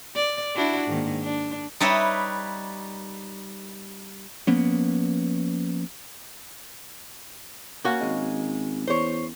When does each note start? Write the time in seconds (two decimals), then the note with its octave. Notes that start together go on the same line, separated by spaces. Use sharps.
0.16 D5
0.56 D4 E4 F#4
0.88 G#2 D#3 A#3
1.23 D4
1.80 G3 D#4 B4 C#5 D#5 E5
4.47 F3 A#3 B3 C#4
7.84 A#3 C#4 F#4
8.01 G#1 G#3
8.87 E2 C5 C#5